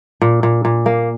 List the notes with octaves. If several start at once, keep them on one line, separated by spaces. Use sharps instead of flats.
A#2
A#2
A#2
A#3